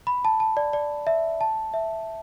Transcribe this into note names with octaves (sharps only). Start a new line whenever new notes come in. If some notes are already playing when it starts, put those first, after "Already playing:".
B5
A5
A5
D5
D5
E5
A5
E5